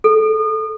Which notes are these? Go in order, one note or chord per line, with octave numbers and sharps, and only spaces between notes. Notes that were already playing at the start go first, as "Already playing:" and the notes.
A4